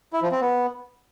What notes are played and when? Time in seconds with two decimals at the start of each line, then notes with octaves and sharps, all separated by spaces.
0.13 E4
0.22 F3
0.32 C4
0.41 B3